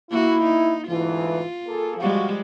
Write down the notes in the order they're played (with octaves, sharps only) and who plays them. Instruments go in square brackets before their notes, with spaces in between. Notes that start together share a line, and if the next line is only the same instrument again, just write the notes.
[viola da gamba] A#3 F#4 [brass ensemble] E4
[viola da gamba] D#4
[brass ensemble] D2 G#2 E3 [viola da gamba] F4
[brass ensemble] A#3 G#4 A4
[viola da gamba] F3 G3 G#3 [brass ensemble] F#4 F5